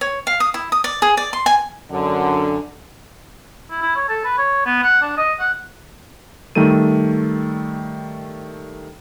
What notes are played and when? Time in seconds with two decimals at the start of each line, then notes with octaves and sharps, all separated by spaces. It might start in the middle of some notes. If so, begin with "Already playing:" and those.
0.01 C#5
0.27 F5
0.40 D#6
0.54 E4
0.72 D#6
0.84 D5
1.02 G#4
1.17 D5
1.33 C6
1.46 G#5
1.91 F#2 D3
3.71 E4
3.82 E4
3.96 C#5
4.09 A4
4.25 B4
4.38 C#5
4.66 B3
4.83 F#5
5.02 D4
5.17 D#5
5.39 F#5
6.55 D#3 G3 A3 A4 D#7